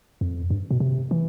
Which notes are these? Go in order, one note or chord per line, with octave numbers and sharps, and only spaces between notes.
F2
G2
B2
C3
E3